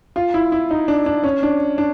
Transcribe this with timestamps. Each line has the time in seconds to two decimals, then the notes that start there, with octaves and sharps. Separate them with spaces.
0.16 F4
0.34 E4
0.52 E4
0.71 D#4
0.88 D4
1.06 D4
1.24 C#4
1.43 D4
1.78 D4